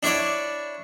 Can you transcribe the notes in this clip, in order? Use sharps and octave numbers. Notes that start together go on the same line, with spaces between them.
D4 E4 C#5 D5